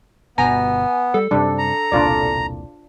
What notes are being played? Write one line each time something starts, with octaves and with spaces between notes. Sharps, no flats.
G1 B2 B3 G#5 A#5
G3 A4
F#2 C3 G3 D4
A#5
E1 C2 A#2 D4 F4 D5